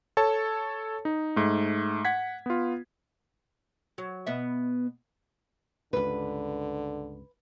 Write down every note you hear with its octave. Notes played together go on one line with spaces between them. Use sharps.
A4 C#5 A5
D#4
G#2 A3
F#5 G#6 B6
B3 F4
F#3
B2 B3 E5
C#2 G2 D3 B4